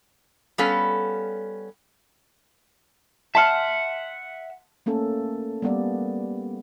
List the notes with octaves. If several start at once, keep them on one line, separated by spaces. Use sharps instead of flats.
G3 B3 C#4 A4 F5
E5 F#5 A5 C6 F6
A3 A#3 C#4 A4
G3 A#3 B3 D5